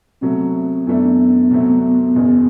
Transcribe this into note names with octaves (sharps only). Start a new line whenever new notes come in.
C2 B2 F#3 A3 C4
F#2 E3 A3 B3 D4
C2 B2 F#3 A3 C4
F#1 E2 B2